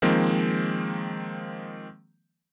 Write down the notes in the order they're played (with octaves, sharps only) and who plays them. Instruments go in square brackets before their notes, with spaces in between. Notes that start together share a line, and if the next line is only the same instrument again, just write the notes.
[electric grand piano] D#3 F3 G#3 A#3 C4